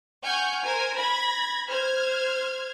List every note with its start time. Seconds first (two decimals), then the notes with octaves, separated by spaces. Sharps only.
0.25 F#5 G#5 C#6 F6 G6
0.63 A#4 C5 G#5
0.96 B5 G#6 A#6
1.69 C5 F6 G#6